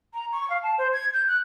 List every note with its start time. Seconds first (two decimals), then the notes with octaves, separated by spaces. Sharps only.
0.14 A#5
0.32 C#6
0.50 F5
0.63 A5
0.78 C5
0.93 G#6
1.13 G6
1.28 F#6